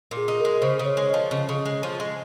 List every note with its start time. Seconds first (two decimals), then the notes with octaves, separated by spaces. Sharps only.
0.11 A#2
0.17 G#4
0.28 D#4
0.40 G#3 A#4
0.62 C#3 C5
0.79 C#3
0.85 C#5
0.97 G#3
1.09 D#5
1.14 F3
1.31 C#3 D#5
1.49 C#3
1.65 G#3
1.83 F3
2.00 G#3